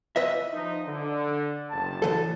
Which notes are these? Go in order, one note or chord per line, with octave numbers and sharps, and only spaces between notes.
B4 D#5 E5
F3 D#4
D3
F#1 A5
A2 E3 A4